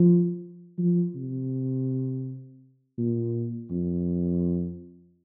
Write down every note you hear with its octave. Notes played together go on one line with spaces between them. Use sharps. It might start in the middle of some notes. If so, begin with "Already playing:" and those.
Already playing: F3
F3
C3
A#2
F2